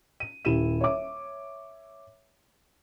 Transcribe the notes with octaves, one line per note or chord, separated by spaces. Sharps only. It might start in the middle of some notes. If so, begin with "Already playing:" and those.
D#7
D#1 E4 G4 D#7 E7
C#5 E5 D6